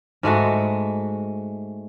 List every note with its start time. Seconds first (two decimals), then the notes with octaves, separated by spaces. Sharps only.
0.23 G#2 G#3 A3 F#4